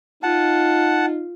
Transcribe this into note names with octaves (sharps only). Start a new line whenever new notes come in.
D#4 F4 F#5 A5